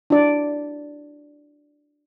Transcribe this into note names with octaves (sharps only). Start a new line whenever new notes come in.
D4 E4 F#4 D5